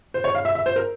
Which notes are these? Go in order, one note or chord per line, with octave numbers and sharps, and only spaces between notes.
C5
C#5
F5
E5
E5
C5
A#4